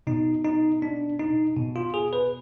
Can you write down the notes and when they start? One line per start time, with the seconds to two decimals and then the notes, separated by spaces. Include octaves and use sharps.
0.07 B2 D#4
0.44 D#4
0.82 D4
1.20 D#4
1.57 B2
1.76 F4
1.94 G#4
2.13 B4